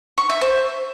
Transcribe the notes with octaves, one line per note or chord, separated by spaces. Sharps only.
C#6
E5
C5